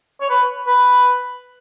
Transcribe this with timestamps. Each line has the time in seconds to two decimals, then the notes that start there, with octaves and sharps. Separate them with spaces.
0.21 C#5
0.30 B4
0.67 B4